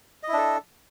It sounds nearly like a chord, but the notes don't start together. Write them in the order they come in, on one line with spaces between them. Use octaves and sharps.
D#5 E4 D4 A4